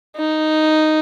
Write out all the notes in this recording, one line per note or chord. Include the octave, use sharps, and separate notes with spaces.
D#4